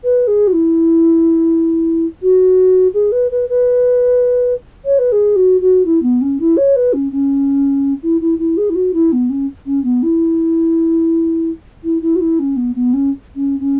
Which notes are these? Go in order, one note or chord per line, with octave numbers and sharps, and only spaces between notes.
B4
G#4
F#4
E4
F#4
G#4
B4
B4
B4
C#5
B4
G#4
F#4
F#4
E4
B3
C#4
E4
C#5
B4
C#4
C#4
E4
E4
E4
G#4
E4
F#4
E4
B3
C#4
C#4
B3
E4
E4
E4
F#4
E4
C#4
B3
B3
C#4
C#4
C#4